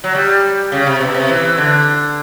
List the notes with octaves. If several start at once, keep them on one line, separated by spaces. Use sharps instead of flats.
F#3
G3
C#3
C3
B2
C3
E3
D3